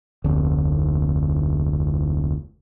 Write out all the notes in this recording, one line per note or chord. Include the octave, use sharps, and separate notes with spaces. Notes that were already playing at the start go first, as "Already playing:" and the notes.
F1 D2